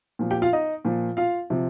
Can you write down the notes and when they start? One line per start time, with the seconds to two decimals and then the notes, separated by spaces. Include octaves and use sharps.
0.19 A#2 F3
0.31 G4 G5
0.42 F4 F5
0.53 D#4 D#5
0.85 A#2 F3
1.17 F4 F5
1.50 C3 F3